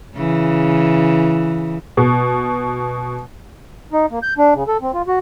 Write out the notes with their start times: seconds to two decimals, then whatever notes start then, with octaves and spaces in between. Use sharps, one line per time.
0.16 C#3 E3
1.97 B2
3.93 D#4
4.11 A#3
4.23 G6
4.38 D4
4.55 C#3
4.68 A4
4.82 C4
4.94 F4
5.08 F#4